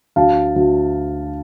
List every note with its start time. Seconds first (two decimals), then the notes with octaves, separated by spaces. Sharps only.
0.16 D2 F5 A5
0.56 D2